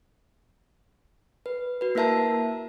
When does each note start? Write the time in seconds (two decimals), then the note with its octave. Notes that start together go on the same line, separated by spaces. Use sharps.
1.46 B4
1.81 F#4 B4
1.95 A#3 E4 A#4 E5 A5 A#5